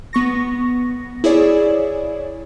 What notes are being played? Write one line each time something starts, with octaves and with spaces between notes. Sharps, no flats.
B3 C#6 A#6
E4 G#4 C#5 D5